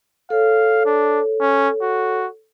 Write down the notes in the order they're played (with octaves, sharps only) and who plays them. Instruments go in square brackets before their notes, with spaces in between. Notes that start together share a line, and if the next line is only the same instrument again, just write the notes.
[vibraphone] A4 C#5 [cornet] F5
[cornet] D4
C#4
F#4